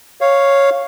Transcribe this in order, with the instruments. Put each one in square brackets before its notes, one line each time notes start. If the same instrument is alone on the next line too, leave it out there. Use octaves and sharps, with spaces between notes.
[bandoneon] C#5 F5